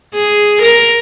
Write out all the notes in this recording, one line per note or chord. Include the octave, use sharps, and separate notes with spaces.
G#4
A#4